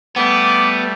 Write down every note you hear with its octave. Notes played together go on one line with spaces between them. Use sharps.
G3 A3 B3 D6